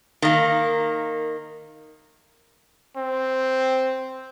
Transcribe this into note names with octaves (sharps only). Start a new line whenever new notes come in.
D#3 A#3
C4